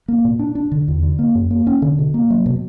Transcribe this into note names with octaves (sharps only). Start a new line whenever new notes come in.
A#3
A#2
D4
D4
D3
E2
D3
A#3
F#2
A#3
C#4
D3
B2
A#3
F#3
B2